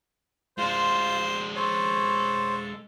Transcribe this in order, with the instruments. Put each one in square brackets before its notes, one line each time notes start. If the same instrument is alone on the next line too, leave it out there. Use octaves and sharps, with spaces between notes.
[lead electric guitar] G#3 D4 [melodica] F4 [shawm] C5
[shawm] A4 [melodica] C5 C#5